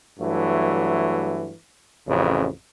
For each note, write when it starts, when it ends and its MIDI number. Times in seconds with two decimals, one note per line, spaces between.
0.19 1.54 43
0.19 1.54 52
0.19 1.54 54
0.19 1.54 57
2.07 2.48 33
2.07 2.48 41
2.07 2.48 49